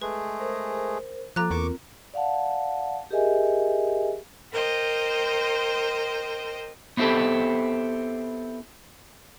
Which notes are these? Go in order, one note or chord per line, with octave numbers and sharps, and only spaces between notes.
G#3 A3 G#4 B4
A#4 C5
F3 A#3 A4 A#5 D6 F#6
E2 C4 F4 A#4 C#6 D6
D5 F5 F#5 A5
G4 G#4 A#4 D#5 E5 G#5
A#4 C5 D#5 G5
B3 C4 E4 G4 A4